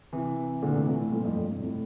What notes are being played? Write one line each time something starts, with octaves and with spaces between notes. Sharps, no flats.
C3 E3
A#2 D3
A2 C3
C3 E3
A2 C3
G2 A#2
F2 A2
G2 A#2
A2 C3
A2 C3